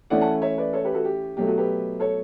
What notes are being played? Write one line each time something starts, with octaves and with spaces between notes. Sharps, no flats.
E3 A3 C#4 E4 D5 F#5
F#5 A5
C#5 E5
B4 D5
A4 C#5
G4 B4
F#4 A4
G4
B2 F#3 A3 G4
F#4 A4
G4 B4
A4 C#5